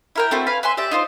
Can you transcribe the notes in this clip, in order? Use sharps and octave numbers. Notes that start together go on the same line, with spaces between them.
E4 A#4 G5
A3 C4 E4 F#4
B4 F5 G#5 B5
B4 E5 G#5 C6
G4 D5 E5
D#4 F4 C5